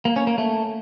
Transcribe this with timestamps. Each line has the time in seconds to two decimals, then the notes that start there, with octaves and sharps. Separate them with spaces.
0.05 A#3
0.16 C#4
0.27 A#3
0.38 A3